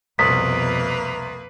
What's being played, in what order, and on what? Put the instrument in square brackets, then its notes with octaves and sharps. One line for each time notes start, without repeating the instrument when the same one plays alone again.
[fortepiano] C2 [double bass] F2 B2 [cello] A#3 B4 [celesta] D#6 B6